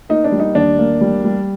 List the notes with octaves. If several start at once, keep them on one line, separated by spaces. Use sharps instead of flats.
A#3 D#4
D4
G3
D#4
D#2 D4
A#3
G3
G3